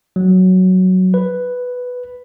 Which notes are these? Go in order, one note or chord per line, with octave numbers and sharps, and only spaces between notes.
F#3
B4